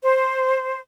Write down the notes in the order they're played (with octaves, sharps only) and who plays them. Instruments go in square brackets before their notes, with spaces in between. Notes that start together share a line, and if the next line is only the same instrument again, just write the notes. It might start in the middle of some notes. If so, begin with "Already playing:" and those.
[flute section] C5